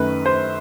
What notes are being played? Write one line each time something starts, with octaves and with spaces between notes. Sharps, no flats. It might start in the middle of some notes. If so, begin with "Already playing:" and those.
Already playing: F#2 D#3 A3 B4
C5